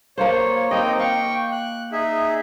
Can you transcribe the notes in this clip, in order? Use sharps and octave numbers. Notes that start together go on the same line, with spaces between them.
A#3 F4 C5 C#5
A#3 C4 D#4 D#5 G5
F5 G5 C#6
F#6
D#4 G#4 E5